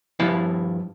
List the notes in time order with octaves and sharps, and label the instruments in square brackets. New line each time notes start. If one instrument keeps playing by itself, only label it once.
[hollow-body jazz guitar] G2 F3 E4 F5